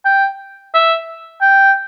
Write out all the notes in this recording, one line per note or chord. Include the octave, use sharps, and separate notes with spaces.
G5
E5
G5